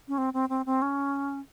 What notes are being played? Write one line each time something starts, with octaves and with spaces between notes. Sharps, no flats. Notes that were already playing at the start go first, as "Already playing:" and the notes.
C#4
C4
C4
C4
C4
C#4